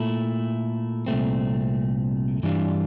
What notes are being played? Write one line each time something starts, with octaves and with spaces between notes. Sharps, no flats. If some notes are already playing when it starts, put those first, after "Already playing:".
Already playing: A#2 A3 E4
C2 A#2 A3 C4
G2 E3 G3 D4 F4